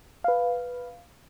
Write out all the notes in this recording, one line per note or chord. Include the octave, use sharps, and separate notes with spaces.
B4 F5